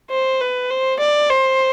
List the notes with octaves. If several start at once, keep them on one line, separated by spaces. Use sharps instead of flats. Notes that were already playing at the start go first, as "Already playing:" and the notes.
C5
B4
C5
D5
C5